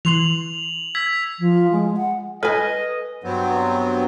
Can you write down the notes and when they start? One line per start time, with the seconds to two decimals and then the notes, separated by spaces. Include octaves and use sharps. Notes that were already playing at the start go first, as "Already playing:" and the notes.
0.05 E3 C6 F7 F#7
0.95 E6 G#6 B6
1.40 F3
1.72 G#3
1.96 F#5
2.43 A4 B4 D#5 G#5
3.24 G2 F#3 B3 C4